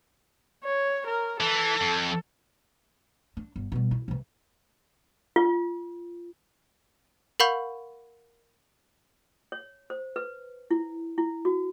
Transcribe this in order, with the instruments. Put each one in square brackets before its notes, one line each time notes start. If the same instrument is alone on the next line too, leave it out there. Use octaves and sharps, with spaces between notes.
[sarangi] C#5
A#4
[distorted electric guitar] E3 [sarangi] A4
[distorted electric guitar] F2
[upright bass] D4
G1
B2 G3
E4
C3 E3
[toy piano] F4
[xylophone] A#4 F5 F#5 B5 C#6 G6
[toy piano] C#5
C5
B4
E4
E4
F#4